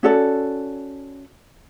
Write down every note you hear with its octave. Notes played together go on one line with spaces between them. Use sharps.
C#4 F#4 A4 D5